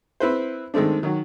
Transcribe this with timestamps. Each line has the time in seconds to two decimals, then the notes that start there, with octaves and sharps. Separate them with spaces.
0.20 C4 E4 B4 C5
0.74 D#3 G#3 A3 C4 D4
1.03 D#3 F#3